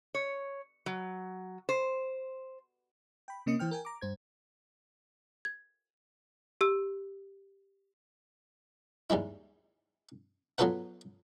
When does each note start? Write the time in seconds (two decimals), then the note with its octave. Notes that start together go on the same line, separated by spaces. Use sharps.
0.15 C#5
0.86 F#3
1.69 C5
3.28 G5 B5
3.46 C3 A#3 C#4 D#5 D#6 C#7
3.59 E3 C5 G5 F6
3.71 A#4 G5 G#5
3.85 A#5 D6
4.01 G2 C5 G#6
5.45 G#6
6.61 G4 E6
9.10 D#2 G3 G#3 E4
10.58 F#3 B3 F4 A4 B4 F#5